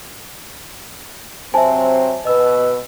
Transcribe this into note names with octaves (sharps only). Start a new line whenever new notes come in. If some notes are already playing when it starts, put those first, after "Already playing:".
C3 F#3 C4 C5 E5 G#5 A5
B2 B4 D#5 E6